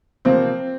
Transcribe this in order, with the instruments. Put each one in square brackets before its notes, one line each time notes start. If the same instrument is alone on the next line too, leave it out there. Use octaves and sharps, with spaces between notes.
[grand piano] C3 F3 A#3 C4